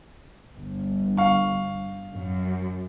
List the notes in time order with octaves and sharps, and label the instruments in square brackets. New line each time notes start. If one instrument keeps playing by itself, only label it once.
[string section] G1
[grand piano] F5 C#6
[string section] F#2